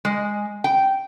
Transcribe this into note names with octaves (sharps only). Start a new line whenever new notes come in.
G#3
G5